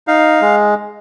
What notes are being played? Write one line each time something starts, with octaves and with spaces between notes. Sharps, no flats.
D#4 F5
G#3